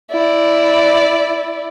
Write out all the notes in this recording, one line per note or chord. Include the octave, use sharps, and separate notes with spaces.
E4 D5